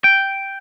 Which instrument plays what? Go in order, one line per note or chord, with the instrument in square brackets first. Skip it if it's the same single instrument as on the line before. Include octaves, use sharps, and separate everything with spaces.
[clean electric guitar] G5